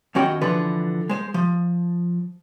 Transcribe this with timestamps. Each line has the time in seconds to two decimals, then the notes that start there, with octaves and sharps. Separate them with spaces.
0.15 F#2 D#3 C#4 F#4 D#5 G5
0.42 D3 E3 F3 B4
1.09 G#3 C5
1.34 F3